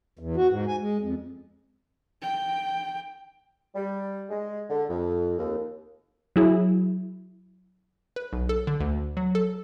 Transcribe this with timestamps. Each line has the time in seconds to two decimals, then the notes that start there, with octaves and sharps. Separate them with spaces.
0.19 E2
0.37 F#4
0.50 G#2
0.67 G#5
0.81 G#3
1.01 F2
2.22 G5
3.75 G3
4.29 G#3
4.69 D3
4.88 F2
5.37 D#2
6.36 F#3 E4 G#4
8.16 B4
8.33 B1
8.49 A4
8.67 D3
8.80 D2
9.17 F#3
9.35 A4